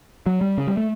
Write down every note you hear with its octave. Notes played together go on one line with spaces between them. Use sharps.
F#3
G3
C#3
G3
A3